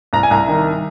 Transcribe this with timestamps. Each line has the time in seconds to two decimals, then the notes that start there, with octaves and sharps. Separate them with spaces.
0.13 C2 A#5
0.23 G#5
0.31 C2 A#5
0.48 D#3